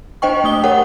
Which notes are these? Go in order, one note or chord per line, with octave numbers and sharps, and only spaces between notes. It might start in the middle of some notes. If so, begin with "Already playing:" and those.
D4 C5 D#5 G5 C#6
A3 D#6 G7
G4 A#4 C#5 F#5